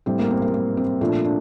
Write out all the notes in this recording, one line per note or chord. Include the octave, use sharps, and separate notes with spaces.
A2 G3 C4
A#3
C4
A#3
A#3
C4
A#2 F3 A3 D4
D4